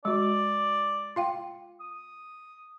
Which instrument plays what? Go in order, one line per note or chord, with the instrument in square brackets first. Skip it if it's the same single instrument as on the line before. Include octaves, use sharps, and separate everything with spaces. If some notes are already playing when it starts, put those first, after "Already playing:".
[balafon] G#3 F#4 [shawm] D5
[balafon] F4 F5 G5
[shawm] D#6